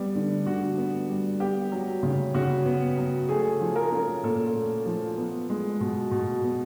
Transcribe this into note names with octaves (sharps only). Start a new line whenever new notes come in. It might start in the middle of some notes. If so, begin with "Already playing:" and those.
Already playing: G3 B3
D3
D3 F#4
B3
G3
B3 G4
F#3
C#3
C#3 F#4
B3
F#3
A3 G#4
F3
A#4
C#4
A#2 A4
A3
F3
B3
G#3
B2
B2
B3